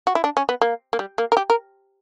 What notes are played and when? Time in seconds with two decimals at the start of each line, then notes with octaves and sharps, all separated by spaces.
0.07 F#4
0.15 E4
0.24 D4
0.37 C#4
0.49 B3
0.61 A#3
0.93 A#3
0.99 G3
1.18 A#3
1.32 A#4
1.37 G4
1.50 A#4